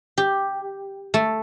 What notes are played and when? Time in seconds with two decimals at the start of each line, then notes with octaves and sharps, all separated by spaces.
0.18 G4
1.14 A3